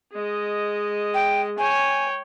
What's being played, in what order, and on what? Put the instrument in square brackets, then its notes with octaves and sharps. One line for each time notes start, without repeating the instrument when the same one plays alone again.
[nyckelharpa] G#3 D#5
[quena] G5
[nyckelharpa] C#5 G5 [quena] G#5